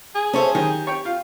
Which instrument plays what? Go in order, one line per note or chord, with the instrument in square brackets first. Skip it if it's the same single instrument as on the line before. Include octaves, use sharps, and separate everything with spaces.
[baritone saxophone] G#4
[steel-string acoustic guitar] C#4 C5 [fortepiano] A4 C#5 E5
[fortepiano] D#3 [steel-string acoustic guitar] G4
[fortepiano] C#5 G5
F4